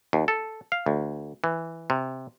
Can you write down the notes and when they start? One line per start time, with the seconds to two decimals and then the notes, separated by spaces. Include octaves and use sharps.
0.13 D#2
0.28 A4
0.72 F5
0.86 D2
1.44 E3
1.90 C3